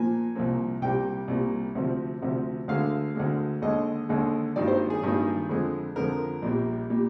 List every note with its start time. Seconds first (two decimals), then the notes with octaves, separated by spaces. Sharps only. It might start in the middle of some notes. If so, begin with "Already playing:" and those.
Already playing: A#2 F3 A#3 G#5
0.35 C2 A#2 F3 A#3
0.82 C2 A#2 G3 A#3 G5
1.28 C2 A#2 G3 A#3
1.75 D2 C3 F3
2.22 D2 C3 F3
2.68 D2 D3 G#3 F5
3.15 D2 D3 G#3
3.62 D#2 D3 G#3 D#5
4.09 D#2 D3 G#3
4.56 G#1 G2 D#3 G3 A#3 D5
4.68 C5
4.90 G#4
5.02 G#1 G2 D#3 G3 A#3
5.49 F2 D3 F3 G#3
5.96 F2 D3 F3 G#3 A#4
6.42 A#1 A#2 G3 A#3
6.90 A#2 G3 A#3